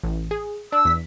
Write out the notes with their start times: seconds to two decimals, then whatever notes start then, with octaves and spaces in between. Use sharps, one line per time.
0.04 A1
0.31 G#4
0.72 D4 E6
0.85 E2 B6